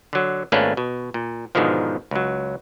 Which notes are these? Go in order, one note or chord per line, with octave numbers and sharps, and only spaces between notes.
D3 F#3
G#1 A3 A#3 C#4 D4 B4
B2
A#2
G#2 B2 D3 D#3 F3
C#2 F#3